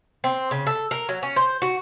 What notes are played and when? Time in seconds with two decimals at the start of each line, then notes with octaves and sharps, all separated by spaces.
0.24 C4
0.51 C#3
0.67 A4
0.91 A#4
1.09 F#3
1.23 C#4
1.36 C5
1.62 F#4